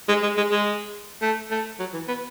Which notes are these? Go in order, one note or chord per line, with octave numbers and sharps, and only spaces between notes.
G#3
G#3
G#3
G#3
A3
A3
F#3
E3
B3